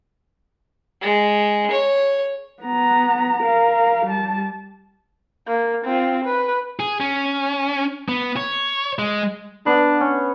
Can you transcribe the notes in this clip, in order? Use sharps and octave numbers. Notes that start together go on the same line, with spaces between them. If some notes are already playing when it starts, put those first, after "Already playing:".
G#3
C#5
B3 A#5
A#4 F5
G3 A5
A#3
C4 F4
B4
G#4
C#4
B3
C#5
G#3
B3 D4
C#4 F#5 C#6